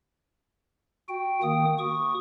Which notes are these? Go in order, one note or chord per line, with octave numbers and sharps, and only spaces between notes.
F#4 G5
D#3 A#3 G5 D#6
F#4 C#6 D#6